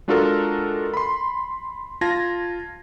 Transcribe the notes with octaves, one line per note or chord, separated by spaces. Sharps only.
G#3 D4 F4 F#4 A4 A#4
B5 C6
F4 A5 G#6 A#6